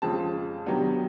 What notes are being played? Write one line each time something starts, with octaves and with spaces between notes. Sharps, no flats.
F2 C#3 F3 G#3 C4 A5
C3 D#3 F#3 B3 D4